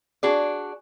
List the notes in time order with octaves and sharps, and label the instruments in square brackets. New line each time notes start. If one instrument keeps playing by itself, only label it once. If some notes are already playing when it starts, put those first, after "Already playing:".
[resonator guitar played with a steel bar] D4 F#4 G#4 D5